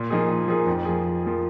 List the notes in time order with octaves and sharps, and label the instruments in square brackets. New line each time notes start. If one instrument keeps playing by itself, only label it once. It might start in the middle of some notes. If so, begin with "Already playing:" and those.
Already playing: [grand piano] A#2
F3 A#3 D#4 G#4
A#2
F3 A#3 D#4 G#4
F2
F3 A#3 G#4
F2
F3 A#3 G#4